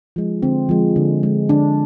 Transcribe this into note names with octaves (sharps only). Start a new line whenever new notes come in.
F3 G#3
D3 C4
F3 G#3
D3
G#3
D3 D4